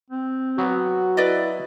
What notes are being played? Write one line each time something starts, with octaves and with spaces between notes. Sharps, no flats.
C4
F#3 B3 F#4
E4 B4 D5 D#5